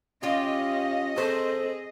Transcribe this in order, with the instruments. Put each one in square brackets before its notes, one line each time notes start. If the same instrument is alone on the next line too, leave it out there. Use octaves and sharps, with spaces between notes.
[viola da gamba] C#4 [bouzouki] F4 G4 [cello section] D#5 [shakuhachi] F5
[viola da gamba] C4 G#4 [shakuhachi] A4 [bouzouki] C5